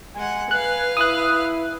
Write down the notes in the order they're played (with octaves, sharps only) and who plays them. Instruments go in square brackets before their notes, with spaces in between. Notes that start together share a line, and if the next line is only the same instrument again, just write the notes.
[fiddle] G#3 F#5 [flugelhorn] G#5
[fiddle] B4 F5 [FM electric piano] F#6
[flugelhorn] E4 [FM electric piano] D#6 F#6